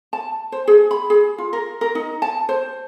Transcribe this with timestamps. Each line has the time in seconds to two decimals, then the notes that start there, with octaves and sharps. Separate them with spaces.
0.13 A5
0.52 C5
0.68 G#4
0.91 B5
1.10 G#4
1.38 F4
1.53 A#4
1.81 A#4
1.95 D#4
2.22 A5
2.49 C5